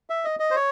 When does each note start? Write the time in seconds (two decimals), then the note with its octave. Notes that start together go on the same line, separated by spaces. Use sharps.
0.10 E5
0.25 D#5
0.40 D#5
0.51 C5
0.56 C#5